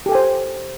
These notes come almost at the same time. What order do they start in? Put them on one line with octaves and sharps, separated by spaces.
G4 A4 G#5 C5